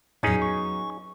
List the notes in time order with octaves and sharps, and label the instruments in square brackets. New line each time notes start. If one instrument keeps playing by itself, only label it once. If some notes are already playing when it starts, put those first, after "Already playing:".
[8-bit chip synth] E2 A2 [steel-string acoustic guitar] F#3 B3 [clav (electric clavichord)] C#4 D#4 G#4
[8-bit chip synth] C#6